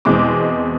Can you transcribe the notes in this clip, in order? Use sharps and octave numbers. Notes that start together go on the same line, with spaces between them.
E2 B2 G#3 C4 D6